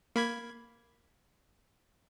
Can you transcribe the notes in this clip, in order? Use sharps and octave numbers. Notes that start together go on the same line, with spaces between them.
A#3 B5 G#6